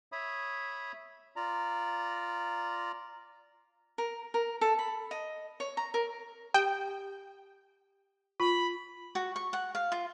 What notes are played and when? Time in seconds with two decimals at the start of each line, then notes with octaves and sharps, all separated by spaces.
0.12 C#5 E5 B5 D#6
1.36 F4 D5 A#5
3.98 A#4
4.34 A#4
4.61 A4
4.79 B5
5.11 D#5
5.60 C#5
5.77 A#5
5.94 A#4
6.54 G4 G5
8.40 F4 B5
9.15 F#4
9.36 C#6
9.53 F#5
9.75 F5
9.92 F4